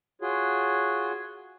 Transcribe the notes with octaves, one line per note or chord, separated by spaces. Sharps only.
F4 F#4 G#4 C#5